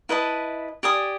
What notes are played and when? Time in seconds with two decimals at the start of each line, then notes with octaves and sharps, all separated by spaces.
0.09 E4 B4 D#5 A5
0.83 G4 D5 G#5 D#6